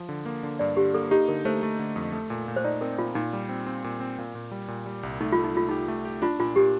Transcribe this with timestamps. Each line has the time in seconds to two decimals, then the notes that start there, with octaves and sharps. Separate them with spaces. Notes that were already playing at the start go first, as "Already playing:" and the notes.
Already playing: F3
0.09 D3
0.26 A#3
0.43 D3
0.59 G2 D5
0.77 D3 G4
0.94 A#3 A4
1.11 D#4 G4
1.28 D3 A#4
1.45 A3 C5
1.63 A3
1.79 D3
1.96 F2
2.13 A3
2.30 A#2
2.48 A#2
2.56 C5
2.64 D#4 D5
2.81 C4 A#4
2.98 A#2 F4
3.15 A#2 D#4
3.33 G3
3.49 C4
3.66 C4
3.84 A#2
4.00 C4
4.18 A#2
4.35 A#2
4.51 G3
4.68 A#2
4.86 G3
5.03 C2
5.21 A3 D#4
5.32 F4
5.38 A3
5.44 D#4
5.55 A3 F4
5.69 D#4 G4
5.88 A3
6.05 G4
6.22 D4 F4
6.39 A#2 F4
6.56 A#2 G4